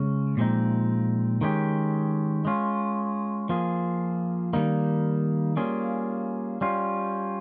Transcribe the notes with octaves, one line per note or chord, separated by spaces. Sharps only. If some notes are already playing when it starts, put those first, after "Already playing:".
Already playing: C#3 G#3 C#4
A#2 F3 G#3 C4 D#4
D#3 G#3 C#4 G4
G#3 C#4 F4
F3 A#3 F4 G#4
D#3 G3 A#3 D#4
G3 A#3 C#4 F4 G#4
G3 C#4 F4